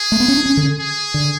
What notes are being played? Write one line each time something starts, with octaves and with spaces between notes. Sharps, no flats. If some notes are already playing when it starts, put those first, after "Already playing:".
Already playing: G#4
A3
B3
C#4
D4
C#4
D3
G#4
D3